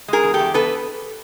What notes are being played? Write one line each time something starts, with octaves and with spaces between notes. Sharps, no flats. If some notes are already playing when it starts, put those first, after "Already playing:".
G#3 G#4 A#4
E2
G4 A4
E2
B3 A4 B4